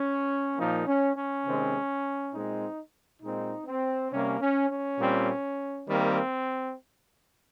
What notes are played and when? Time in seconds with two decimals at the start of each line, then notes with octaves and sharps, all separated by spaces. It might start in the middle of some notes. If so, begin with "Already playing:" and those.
Already playing: C#4
0.57 A#2 F3 A#3 D#4
0.87 C#4
1.16 C#4
1.45 C3 D#3 G#3 C4
2.34 A#2 G#3 C4 D#4
3.22 A#2 G#3 C4 D#4
3.67 C4
4.11 C3 G3 A#3 C#4
4.41 C#4
4.71 C#4
4.99 A#2 G3 C4
5.88 D#3 G3 A#3 C4